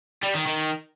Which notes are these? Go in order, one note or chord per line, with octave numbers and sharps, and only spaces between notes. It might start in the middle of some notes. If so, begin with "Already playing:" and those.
G3
D#3
D#3